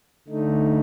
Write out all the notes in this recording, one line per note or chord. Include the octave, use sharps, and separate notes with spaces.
D3 A3 D#4